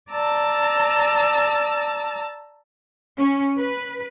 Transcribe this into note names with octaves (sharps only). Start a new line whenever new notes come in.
D5 A5 A#5 E6
C#4
B4